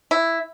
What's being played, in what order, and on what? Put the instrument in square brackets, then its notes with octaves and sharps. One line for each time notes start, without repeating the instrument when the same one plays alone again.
[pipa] E4